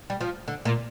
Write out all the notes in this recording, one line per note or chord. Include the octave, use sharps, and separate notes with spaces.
G3
F3
D3
A#2